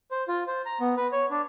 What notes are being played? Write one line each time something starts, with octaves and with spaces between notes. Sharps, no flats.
C5
F4
C5
A#5
B3
B4
C#5
D4